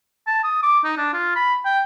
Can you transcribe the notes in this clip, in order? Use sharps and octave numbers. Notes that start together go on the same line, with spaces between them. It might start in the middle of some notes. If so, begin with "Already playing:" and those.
A5
D#6
D6
D#4
D4
F4
B5
G5